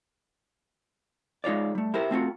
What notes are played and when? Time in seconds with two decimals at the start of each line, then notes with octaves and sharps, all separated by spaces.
1.44 G#3 D#4 F4 C#5 D5
1.75 G3 A3
1.94 E4 G4 A#4 C5
2.11 A3 C4 F4 F#4